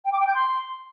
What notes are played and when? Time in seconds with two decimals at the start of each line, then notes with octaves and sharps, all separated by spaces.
0.05 G5
0.12 D6
0.20 G5
0.27 G6
0.35 C6